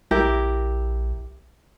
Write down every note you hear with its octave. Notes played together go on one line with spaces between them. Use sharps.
A#1 E4 G4 A#4